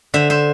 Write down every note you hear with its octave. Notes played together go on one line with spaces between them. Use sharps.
D3 C5 E5
C5 E5